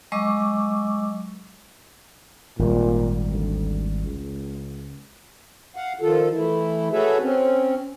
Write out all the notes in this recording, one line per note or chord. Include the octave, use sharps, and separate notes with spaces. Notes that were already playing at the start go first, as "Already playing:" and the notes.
F#3 G#3 D#5 C#6 D6 E6
G#1 A#2 G3
D2
C#2
F5 F#5
D#3 F3 F4 A4
E3 A3 E4
F#4 G#4 A4 B4 C#5 E5
C4 C#4